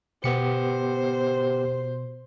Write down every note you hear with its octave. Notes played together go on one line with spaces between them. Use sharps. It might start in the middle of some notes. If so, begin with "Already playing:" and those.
B2 B3 G4 C5 C#7